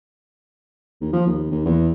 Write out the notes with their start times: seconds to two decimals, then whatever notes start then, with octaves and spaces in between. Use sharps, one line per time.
1.01 D#2
1.13 F3
1.27 D#2
1.51 D#2
1.65 E2